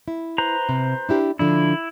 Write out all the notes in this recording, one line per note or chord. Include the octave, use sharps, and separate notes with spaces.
E4
B4 C5 A#5
C3
D4 E4 G4
D3 F3 D4 E4